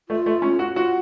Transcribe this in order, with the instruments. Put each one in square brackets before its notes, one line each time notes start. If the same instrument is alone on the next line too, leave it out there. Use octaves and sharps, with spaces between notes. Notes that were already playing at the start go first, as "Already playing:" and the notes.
[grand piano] A3 [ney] F4
[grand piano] A3
C#4
F#4
[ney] F4 [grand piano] F#4